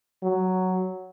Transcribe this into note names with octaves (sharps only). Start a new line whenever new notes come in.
F#3